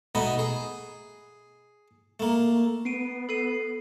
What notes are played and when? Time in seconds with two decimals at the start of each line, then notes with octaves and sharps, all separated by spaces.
0.15 B2 A3 B3 D#4 D#5 B5
0.39 G#4
2.20 A3 A#3
2.85 B3 C7 D7 D#7
3.29 A4 C7 D#7